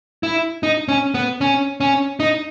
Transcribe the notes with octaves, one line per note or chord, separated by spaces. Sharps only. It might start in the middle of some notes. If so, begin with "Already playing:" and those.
E4
D#4
C#4
B3
C#4
C#4
D#4